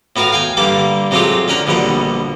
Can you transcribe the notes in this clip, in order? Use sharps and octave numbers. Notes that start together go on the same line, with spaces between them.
A2 B3 F#4 A#4 F5
F5 G5 G#5
G2 D3 G3 A#3 D6
C3 F#3 G#3 A3 F4 G4
D3 C#4 A#4 F#5
A#1 B2 D3 G3 F#5